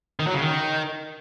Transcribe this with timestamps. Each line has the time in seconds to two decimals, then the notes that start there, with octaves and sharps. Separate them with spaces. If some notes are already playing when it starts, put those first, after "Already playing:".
0.20 D#3
0.27 F#3
0.34 C#3
0.41 D#3